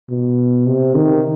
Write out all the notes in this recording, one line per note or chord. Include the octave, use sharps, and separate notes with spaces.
B2
C3
D#3